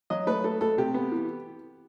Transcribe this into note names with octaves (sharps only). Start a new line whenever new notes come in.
F#3 D#5
A3 B4
A3 A4
A3 A4
C3 G4
B3
E3